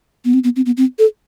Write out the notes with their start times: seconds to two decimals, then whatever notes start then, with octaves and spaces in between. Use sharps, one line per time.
0.25 B3
0.34 C4
0.44 B3
0.56 C4
0.66 B3
0.77 C4
0.99 A4